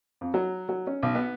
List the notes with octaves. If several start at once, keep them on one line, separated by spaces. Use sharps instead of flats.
F2
F#3
F#3
C#4
B1
B3